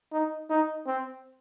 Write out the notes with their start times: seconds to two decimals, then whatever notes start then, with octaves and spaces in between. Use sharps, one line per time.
0.13 D#4
0.50 D#4
0.87 C4